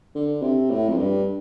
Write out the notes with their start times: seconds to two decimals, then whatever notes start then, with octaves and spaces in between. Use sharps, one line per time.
0.15 D3
0.42 C3
0.70 A2
0.89 F2
0.98 G2